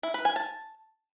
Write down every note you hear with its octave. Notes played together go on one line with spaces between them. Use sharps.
E4
B4
G#5
A5